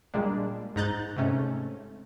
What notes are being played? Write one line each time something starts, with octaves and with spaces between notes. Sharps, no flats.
A#2 G3 G#3 A#3 D4
G#2 D#4 A#5 F#6 G6 A6
G#2 C3 A3 C#4